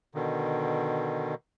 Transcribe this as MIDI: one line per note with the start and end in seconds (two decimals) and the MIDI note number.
0.15 1.35 47
0.15 1.35 50
0.15 1.35 51